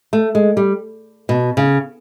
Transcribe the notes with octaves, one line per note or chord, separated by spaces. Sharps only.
A3
G#3
G3
B2
C#3